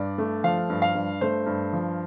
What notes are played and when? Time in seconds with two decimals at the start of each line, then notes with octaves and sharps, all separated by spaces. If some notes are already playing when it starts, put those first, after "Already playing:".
Already playing: G2 D5
0.18 A3
0.44 F3 F5
0.70 G2
0.82 F5
0.95 G2
1.21 A3 C5
1.46 G2
1.73 F3